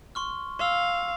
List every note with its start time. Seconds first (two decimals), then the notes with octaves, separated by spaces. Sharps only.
0.15 C6 C#6 F6
0.59 F5 C6 E6